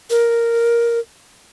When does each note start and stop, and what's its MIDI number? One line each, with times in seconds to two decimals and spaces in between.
0.10 0.99 70